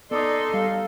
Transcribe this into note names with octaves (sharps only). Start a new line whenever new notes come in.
B3 D#4 A4 D5 C6 D#6
G3 F5